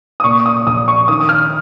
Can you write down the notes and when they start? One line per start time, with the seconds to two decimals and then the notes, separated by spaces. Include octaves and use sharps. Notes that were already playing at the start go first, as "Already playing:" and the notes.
0.20 D#6
0.24 A#2 C#6
0.46 D#6
0.66 A#1 D#6
0.88 C#6
1.08 D#3 D#6
1.20 D#6
1.29 F6